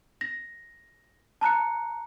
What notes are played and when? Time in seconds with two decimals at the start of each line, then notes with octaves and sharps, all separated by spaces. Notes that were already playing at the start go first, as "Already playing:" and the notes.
0.21 A#6
1.41 A5 A#5 F#6 C#7